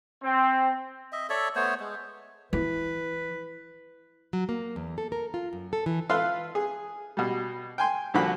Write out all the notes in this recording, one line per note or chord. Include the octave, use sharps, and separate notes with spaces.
C4
D#5 E5
A4 C#5 D5 E5
A3 B3 C5 C#5
G#3
E3 B4
F#3
A#3
E2
A4
A#4
F4
F#2
A4
E3
F4 A4 B4 E5 F5 C6
G#4
B2 G3
G5 G#5 C6
C2 A#2 D3 F3 F#4 B5